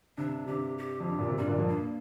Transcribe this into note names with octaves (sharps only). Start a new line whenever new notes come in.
G2 C3 D4
G2 C3 G4
G4
F2
G2
A#2
C3
A#2 D3 G3
A#2 D3
F2 A#2
G2 A#3